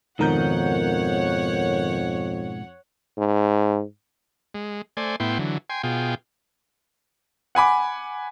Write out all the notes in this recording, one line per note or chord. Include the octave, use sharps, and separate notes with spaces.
F2 G#2 B2 D#3 A#4 C#5 F#5 G6
G#2
G#3
A3 C5 D5 G#5
A2 B3 E4 G5 C6
D3 E3 F#3
G5 G#5 C6
B2 F4 G#4 G5
F#5 G#5 B5 D6